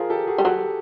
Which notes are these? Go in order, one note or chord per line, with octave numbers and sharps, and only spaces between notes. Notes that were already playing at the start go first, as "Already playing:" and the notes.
Already playing: F3 G#4 A#4
G4 A4
F#4 G#4
G3
F#3 G4 A4